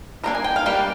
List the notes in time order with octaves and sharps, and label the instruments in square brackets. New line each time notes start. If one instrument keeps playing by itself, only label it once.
[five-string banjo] G3 A#3 D4 A#5
G#5
G5
F5
G3 A#3 D4 G5